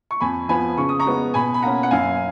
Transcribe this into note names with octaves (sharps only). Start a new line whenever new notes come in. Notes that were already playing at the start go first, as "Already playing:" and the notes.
C#6
F2 G#5 B5
F3 B3 G#5 B5
C#3 C#6
D#6
A#5 C#6
G#3 B3
B2 G#5 B5
B5
A#3 C#4 F#5 A#5
F#5
F#2 F5 G#5